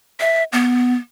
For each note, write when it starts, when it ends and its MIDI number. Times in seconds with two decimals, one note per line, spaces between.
0.20 0.43 76
0.53 0.95 59